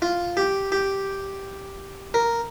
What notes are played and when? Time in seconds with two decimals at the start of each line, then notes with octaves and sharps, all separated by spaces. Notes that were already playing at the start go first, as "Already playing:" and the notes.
0.02 F4
0.37 G4
0.72 G4
2.14 A#4